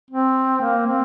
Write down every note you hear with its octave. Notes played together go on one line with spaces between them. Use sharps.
C4
A#3
C4